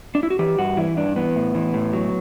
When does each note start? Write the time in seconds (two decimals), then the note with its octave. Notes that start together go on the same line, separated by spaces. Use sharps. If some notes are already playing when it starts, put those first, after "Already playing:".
0.15 D4
0.23 E4
0.30 F#4
0.39 E3 G4
0.59 G2 F#4
0.77 E3 E4
0.97 G2 D4
1.16 E3 B3
1.35 A2
1.55 E3
1.74 A2
1.93 F#3